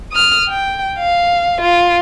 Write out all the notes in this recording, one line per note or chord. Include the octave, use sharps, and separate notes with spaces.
D#6 F6
G5
F5
F4